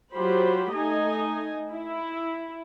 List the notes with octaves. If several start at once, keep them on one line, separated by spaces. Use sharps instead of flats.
F#3 F4 G4 C5 B5
A3 D#4 D#5 G#5
E4